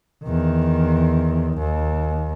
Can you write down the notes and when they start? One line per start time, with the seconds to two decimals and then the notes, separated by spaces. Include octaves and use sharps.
0.24 E2 D#3
1.58 D#2